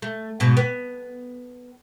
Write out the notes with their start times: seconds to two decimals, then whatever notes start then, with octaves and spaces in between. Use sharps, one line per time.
0.02 A3
0.40 G#2 B2
0.57 B3